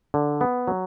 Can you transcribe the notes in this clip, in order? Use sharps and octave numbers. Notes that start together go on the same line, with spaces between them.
D3
B3
F#3